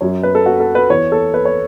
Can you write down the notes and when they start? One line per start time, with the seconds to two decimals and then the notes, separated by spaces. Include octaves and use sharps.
0.01 F#2 F#3 C#5
0.23 B4
0.35 A4
0.46 F#4
0.60 A4
0.75 B4
0.90 E2 E3 C#5
1.12 A4
1.34 B4
1.45 C#5